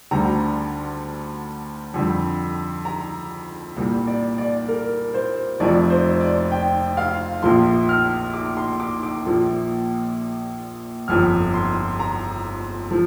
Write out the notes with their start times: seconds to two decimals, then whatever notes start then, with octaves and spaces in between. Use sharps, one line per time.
0.11 D2 D3 G3 A#5
1.94 F2 D3 G3
2.85 A#5
3.77 C2 A#2 G3
4.07 D5
4.38 D5
4.68 A#4
5.14 C5
5.60 F1 F2 F3 D5
5.90 C5
6.21 D5
6.51 G5
6.97 F5
7.43 A#1 A#2 F3 C6
7.89 F6
8.34 D6
8.57 C6
8.80 D6
9.03 D6
9.26 A#1 A#2 F3
11.08 G1 F2 F3 F6
11.54 C6
12.00 A#5
12.91 F3